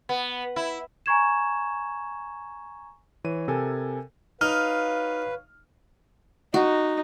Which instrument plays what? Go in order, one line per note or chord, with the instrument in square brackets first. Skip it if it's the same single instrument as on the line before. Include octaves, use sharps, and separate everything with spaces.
[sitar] B3
E4
[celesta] G#5 A#5 C#6 G#6 E7
[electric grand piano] E3 C#5 D#7
C3 A4 A#4 G#5
[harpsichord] D#4 [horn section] F#4 C#5 F5 [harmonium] B4 [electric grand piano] F6
[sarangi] D#4 [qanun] F#4